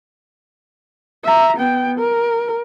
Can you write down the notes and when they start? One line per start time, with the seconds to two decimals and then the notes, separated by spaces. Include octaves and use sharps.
1.24 E5 A#5
1.57 B3 G5
1.98 A#4